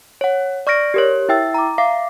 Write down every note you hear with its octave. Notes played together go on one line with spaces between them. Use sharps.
C#5 F#5
D5 C#6 F6 A#6 D7
G4 A#4 C#5
E4 E5 G5 E6 A6
A#5 D6
E5 F5 D6 C7